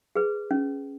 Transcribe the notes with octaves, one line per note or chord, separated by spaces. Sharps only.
G#4 B4
C#4